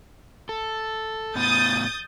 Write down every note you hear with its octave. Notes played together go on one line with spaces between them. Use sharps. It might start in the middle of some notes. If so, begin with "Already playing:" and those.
A4
A2 B3 D#6 G6 A6